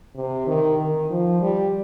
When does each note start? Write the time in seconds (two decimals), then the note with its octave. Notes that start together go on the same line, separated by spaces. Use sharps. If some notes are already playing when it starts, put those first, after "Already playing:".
0.15 C3
0.47 D#3
0.79 D#3
1.10 F3
1.41 G3